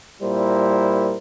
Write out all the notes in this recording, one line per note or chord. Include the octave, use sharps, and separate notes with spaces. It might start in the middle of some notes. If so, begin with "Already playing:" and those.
A#2 G3 E4 A#4 C5